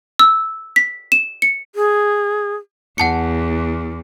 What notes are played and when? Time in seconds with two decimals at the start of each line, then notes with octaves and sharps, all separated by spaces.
0.19 E6
0.76 B6
1.12 E7
1.42 C#7
1.75 G#4
2.98 E2 F#5 A5 C#7